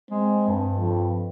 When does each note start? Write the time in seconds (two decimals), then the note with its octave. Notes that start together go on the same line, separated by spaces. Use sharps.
0.11 G#3 C4
0.48 G2
0.78 F2